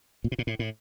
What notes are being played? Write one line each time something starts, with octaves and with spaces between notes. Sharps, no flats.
A#2
B2
A#2
A2
A2